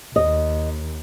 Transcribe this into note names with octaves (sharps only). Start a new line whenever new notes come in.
D#2 D#5